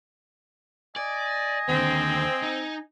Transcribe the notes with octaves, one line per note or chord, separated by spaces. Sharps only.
D5 D#5 G#5
D#2 D3 C4
D#4